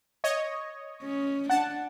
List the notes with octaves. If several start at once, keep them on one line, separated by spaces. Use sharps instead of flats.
C#5 D#5
C#4
D4 F#5 A5